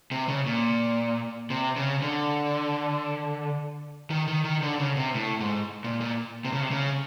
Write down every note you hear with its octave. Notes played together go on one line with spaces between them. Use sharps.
C3
C#3
A#2
C3
C#3
D3
D#3
D#3
D#3
D3
C#3
C3
A2
G#2
A#2
A#2
C3
C#3
C3
C#3